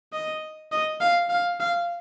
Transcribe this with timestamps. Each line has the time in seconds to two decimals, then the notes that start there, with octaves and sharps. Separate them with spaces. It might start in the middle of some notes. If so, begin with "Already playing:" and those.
0.13 D#5
0.72 D#5
1.01 F5
1.29 F5
1.60 F5